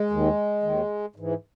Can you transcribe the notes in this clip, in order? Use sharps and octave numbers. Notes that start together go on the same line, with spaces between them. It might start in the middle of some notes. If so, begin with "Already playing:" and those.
Already playing: G#3
D#2 D#3
D#2 D#3
G#2 E3